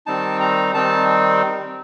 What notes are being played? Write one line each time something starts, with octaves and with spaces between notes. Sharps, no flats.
D#3 G3 C4 D#4 A5
A#5
D#3 G3 C4 D#4 A5